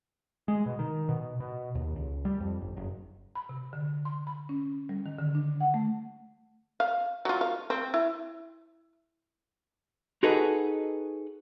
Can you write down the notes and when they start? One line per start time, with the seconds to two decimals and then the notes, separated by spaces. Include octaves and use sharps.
0.48 G#3
0.66 B2
0.79 D#3
1.09 B2
1.40 B2
1.75 D#2
1.96 C#2
2.25 G3
2.40 F2
2.61 G1
2.76 F#1
3.35 B5
3.49 C3
3.73 D3
4.05 C6
4.27 B5
4.49 C#4
4.89 G3
5.06 D#3
5.19 D3
5.35 D4
5.61 F#5
5.74 A3
6.80 F5
7.25 F#3 F4
7.41 F5
7.70 C4
7.94 E4
10.23 D#4 F#4 G#4 A4 B4 D#5